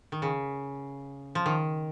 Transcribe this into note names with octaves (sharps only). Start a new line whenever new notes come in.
D#3
C#3
F3
D#3